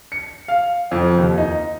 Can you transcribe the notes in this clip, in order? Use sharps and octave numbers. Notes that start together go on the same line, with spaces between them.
C#7
F5
F2
D#2
D#4